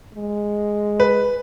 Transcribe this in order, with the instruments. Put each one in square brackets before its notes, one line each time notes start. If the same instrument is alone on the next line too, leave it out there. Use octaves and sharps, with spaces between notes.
[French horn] G#3
[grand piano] B4